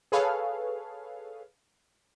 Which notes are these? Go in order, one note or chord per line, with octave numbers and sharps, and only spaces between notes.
G#4 A4 B4 C#5 F5